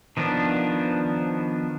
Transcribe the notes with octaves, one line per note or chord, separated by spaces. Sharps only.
D#3 F3 B3 D4